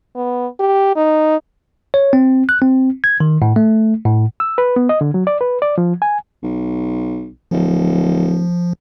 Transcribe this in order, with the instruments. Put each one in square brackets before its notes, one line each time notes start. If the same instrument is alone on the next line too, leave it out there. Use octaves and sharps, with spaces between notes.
[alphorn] B3
G4
D#4
[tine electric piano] C#5
C4
F#6
C4
G#6
D#3
A2
A3
A2
[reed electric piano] E6
B4
B3
D#5
D3
F#3
D5
B4
D5
F3
G#5
[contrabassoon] B1
[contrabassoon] D1 [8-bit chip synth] F3